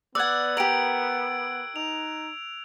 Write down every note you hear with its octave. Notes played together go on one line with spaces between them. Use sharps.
B3 D5 F#5 E6 F#6 G#6
G4 A#4 D7 F#7
D#4 F7